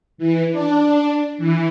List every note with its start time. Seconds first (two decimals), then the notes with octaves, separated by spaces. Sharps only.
0.18 E3
0.52 D4
1.38 E3